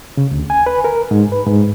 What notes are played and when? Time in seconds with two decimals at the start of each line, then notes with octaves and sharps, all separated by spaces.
0.17 C#3
0.31 D2
0.50 G#5
0.66 B4
0.84 A#4
1.11 G#2
1.32 B4
1.47 G#2